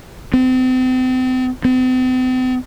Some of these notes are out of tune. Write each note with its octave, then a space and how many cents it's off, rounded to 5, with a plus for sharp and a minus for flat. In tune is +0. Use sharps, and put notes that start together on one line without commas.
C4 -35
C4 -45